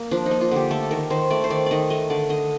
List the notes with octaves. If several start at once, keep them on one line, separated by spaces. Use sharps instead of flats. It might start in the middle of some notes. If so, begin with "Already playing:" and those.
Already playing: A#3
F3 D4
D#4
A#3
F4
D3 G4
A3 A4
D#3 A#4
D#3 C5
A3 D5
C5
D#3 D5
D#3 D5 D#5
A3 D#5
D3 D5
D3 D#5